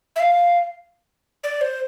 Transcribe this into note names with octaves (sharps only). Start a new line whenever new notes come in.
E5
F5
D5
C5